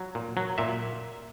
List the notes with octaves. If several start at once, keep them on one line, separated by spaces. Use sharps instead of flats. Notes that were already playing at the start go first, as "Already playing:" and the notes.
Already playing: F#3
A#2
F#3
A#2 E5